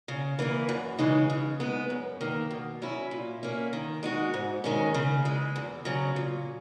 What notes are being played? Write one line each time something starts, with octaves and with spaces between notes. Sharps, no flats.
C#3
E3 A#3 E4
F#2
C#3 E3 G#3 D#4
C#3
G#3 B3
F#2
D#3 A#3
B2
F#3 C#4 E4
A#2
A#3 C#4 E4
D#3
G#3 D#4 F#4
G#2
D#3 G#3 C#4
C#3
E3 G#3
E2
C#3 F#3
A#2